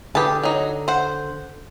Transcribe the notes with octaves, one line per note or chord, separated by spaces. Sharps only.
D3 G4 G#4 B4 A5
F#3 D#4
C5 F#5